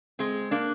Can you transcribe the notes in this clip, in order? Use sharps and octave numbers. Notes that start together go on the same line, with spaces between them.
G#3 C4
A#3 D4